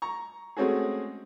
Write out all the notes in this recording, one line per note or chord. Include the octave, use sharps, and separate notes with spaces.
A#5 C#6
G#3 A3 C4 C#4 F#4 G#4